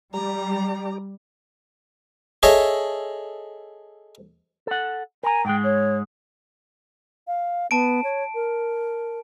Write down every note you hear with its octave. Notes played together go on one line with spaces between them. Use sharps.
G3 G4 D5 A#5
G#4 A4 C#5 D#5 E5
A4 F#5
A#4 G#5 A#5
G#2 G#3 G5
C#5
F5
B3 A5 D7
C#5
A#4